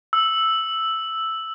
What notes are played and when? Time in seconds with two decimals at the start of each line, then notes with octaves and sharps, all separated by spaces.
0.13 E6